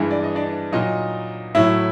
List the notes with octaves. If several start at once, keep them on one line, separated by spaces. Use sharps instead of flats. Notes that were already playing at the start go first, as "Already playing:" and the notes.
Already playing: G2 E3 G#3
D5
D#5
D4 D5
A#2 F#3 D#4 D#5
A2 F#3 E4 E5